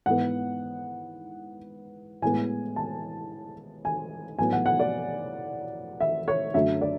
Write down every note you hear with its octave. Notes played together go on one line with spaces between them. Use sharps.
G#2 E3 B3 F#5
A2 E3 G#3 B3 G#5
A5
G#5
A2 F#3 B3 G#5
F#5
F#5
D5
E5
C#5
F#2 D3 F#3 A3 E5
D5